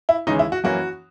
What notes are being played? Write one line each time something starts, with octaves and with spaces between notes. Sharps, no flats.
E4
D#2 C#3 E3 G#3 C#4 D#4
E4
F#4
F#2 E3 A#3 C#4 F#4